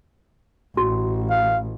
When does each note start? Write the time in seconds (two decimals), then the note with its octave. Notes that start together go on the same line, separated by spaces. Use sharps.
0.77 A1 F#4
1.30 F5